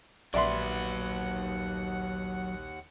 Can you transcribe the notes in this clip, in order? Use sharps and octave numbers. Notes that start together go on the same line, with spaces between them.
A#1 D#2 F#3 B4 D5 E5 F#5 C6